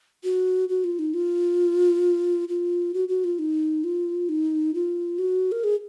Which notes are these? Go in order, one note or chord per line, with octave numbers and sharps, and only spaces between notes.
F#4
F#4
F4
D#4
F4
F4
F#4
F#4
F4
D#4
F4
D#4
F4
F#4
A#4
G#4